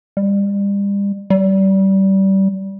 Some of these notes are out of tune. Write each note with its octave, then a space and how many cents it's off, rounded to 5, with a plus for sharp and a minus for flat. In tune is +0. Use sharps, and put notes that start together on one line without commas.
G3 +35
G3 -25